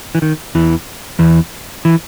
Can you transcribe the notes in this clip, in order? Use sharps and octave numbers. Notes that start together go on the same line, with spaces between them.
E3
D#3
E2 E3
E2 E3
E3